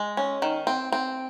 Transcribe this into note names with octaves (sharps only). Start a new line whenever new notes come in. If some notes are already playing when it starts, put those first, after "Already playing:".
Already playing: G#3
C#4
D#3
C4
C4